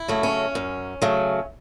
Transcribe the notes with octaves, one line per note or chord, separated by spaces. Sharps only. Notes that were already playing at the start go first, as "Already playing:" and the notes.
Already playing: E4
C#3 F#3 A3
C#4
F#2
C#3 F#3 A3